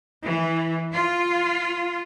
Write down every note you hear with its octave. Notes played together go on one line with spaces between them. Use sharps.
E3
F4